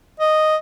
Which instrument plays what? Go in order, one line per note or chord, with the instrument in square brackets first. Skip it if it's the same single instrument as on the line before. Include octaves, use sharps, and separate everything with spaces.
[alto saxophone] D#5